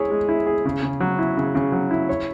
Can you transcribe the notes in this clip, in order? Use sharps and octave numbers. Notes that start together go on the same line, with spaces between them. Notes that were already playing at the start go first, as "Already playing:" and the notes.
Already playing: G#3 E4 G#4 C#5
G#3
E4
G#4
C#3
C#3
F#3
E4
C#3
C#3
F#3
E4
C#5